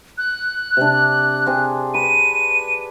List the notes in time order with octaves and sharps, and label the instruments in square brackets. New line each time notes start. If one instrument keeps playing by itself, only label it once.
[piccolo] F#6
[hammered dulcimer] C3 D4
C4 G#4
[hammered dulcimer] B4 [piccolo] D#7